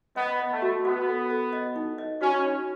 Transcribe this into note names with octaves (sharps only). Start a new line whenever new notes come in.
B3 D#5
D#5
A3
F#4
B3 F#4
A4
A4
D#5
D#4
D#5
C#4 F#4
D#4